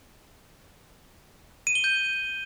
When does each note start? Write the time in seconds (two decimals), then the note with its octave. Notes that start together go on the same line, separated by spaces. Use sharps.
1.67 D#7
1.75 G7
1.84 G6